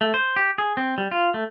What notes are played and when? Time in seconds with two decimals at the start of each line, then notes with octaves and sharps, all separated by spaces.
0.01 A3
0.14 C5
0.36 G4
0.58 G#4
0.77 C4
0.98 G3
1.11 F4
1.34 A3